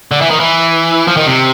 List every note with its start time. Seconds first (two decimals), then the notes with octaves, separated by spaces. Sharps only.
0.12 D3
0.21 E3
0.31 D#3
0.40 E3
1.07 F3
1.17 D#3
1.26 C3